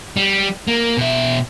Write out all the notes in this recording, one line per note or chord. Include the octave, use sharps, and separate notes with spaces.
G3
A#3
B2 E5